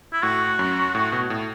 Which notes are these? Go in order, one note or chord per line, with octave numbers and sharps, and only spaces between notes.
E4
A2 F#4
F#2
A2
B2
A2